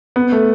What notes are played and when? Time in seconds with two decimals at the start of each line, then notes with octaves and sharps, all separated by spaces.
0.16 B3
0.32 A3